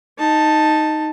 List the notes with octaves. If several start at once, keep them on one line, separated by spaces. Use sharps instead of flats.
D#4 A5